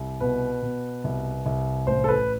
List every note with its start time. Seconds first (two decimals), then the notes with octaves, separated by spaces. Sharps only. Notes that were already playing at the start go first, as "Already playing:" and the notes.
Already playing: C2
0.21 B2 B4
0.62 B2
1.04 C2
1.46 C2
1.87 A1 C5
2.04 A4
2.08 B4